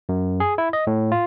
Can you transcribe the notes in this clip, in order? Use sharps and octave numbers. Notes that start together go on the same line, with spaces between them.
F#2
G#4
E4
D#5
A2
F4